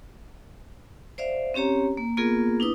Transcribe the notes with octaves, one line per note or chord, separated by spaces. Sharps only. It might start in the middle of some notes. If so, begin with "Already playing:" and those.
C5 D5 E5 F5
C4 C#4 G4 C#5 A#5
A#3
A#3 B3 F4 G#4 A#4
D4 E4 B4 D#6